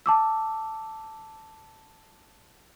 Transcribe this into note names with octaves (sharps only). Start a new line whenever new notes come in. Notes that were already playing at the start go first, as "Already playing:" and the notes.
A5 D6 E6